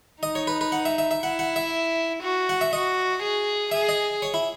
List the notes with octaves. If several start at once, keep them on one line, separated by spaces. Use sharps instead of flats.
D#4 D#5
C#5
B4
B4
F#5
E5
E5
E5
E4 F#5
F#5
E5
F#4
F#5
E5
F#4 D#5
G#4
G#4 E5
D#5
C#5
E4